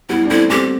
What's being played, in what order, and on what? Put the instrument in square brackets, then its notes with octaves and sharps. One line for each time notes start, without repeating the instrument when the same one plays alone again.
[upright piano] G3 B3 [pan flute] E4
[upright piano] D4
[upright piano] A3 C4 [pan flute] E4
[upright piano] A3 C4 [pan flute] G4